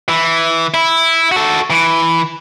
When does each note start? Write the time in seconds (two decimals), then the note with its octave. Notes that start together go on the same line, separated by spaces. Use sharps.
0.09 E3
0.74 E4
1.32 F#4 A4
1.70 E3